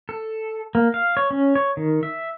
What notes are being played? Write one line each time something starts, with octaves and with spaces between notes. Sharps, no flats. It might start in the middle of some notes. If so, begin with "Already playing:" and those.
A4
A#3
F5
C#5
C#4
C#5
D#3
E5